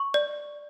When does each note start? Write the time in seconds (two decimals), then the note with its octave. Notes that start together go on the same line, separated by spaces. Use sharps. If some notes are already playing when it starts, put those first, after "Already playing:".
Already playing: C#6
0.14 D5